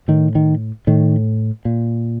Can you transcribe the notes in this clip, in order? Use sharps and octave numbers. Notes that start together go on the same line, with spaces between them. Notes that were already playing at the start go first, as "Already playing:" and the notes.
A2 D#3
D#3
A2 D#3
A#2